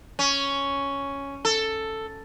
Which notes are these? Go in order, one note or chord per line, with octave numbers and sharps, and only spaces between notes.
C#4
A4